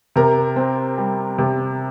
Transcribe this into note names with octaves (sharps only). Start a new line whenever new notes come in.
C3 A#4
C4
G3
C3